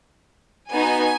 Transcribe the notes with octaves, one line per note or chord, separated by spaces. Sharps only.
B3 D#4 F#4 G#5